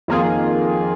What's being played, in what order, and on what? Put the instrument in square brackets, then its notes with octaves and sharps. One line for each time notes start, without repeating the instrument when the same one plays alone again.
[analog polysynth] F2 D#3 A#3 F4 G#4